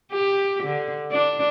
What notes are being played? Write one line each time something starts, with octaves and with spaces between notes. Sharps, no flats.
G4
D3
D4